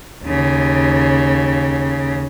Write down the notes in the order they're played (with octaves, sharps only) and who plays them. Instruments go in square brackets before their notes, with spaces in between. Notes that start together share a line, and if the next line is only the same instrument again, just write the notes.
[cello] D#2 C#3